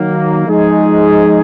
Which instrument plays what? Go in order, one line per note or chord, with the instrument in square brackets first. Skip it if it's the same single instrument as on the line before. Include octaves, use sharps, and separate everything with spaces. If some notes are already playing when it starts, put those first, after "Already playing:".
Already playing: [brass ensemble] D#3 F#3 A#3
F3 G#3 D#4 G#4